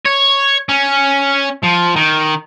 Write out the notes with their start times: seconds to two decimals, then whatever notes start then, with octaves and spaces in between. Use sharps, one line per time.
0.05 C#5
0.69 C#4
1.64 F3
1.96 D#3